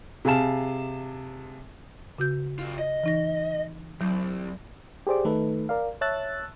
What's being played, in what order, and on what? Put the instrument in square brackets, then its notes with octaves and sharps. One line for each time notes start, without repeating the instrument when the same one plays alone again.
[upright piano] C3 G#4 F5 A5 E7
[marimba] C#3 F#4 G6
[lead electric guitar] G2 F4
D#5
[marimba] E3 D#4 A#6
[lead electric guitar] C2 [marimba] F#3
[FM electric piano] G4 G#4 C5 D5 D6
D#3 A3 D#4 A4 B4
A#4 D5 F5
C#5 E5 A5 E6 F#6 A6